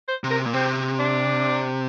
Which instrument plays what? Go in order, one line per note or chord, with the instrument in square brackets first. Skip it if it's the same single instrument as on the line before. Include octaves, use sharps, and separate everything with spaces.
[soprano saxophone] C5
[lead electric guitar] C3
[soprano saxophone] A#4
[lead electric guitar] A#2
[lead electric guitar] C3 [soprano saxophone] C4
[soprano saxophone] D4